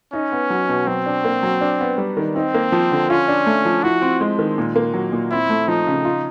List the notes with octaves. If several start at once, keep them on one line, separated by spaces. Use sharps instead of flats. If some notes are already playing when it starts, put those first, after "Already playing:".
C#4 D#4
B3
F#3
B2
F#3 C4
D4
A#3
F#3
D4
B3
G3
D#3
C4 D#4
A#3
F3
D3
C#4 F4
D4
A3
F3
E4 F#4
C4
G#3
D#3
A#2
A#3
F#3
A#2
C4 E4
A3
F3 D#4
C#3
F4